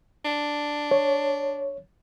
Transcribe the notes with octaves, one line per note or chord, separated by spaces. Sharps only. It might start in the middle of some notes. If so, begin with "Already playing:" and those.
D4
C#5